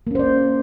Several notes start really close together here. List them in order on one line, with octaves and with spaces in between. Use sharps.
A#3 C#4 C5 D5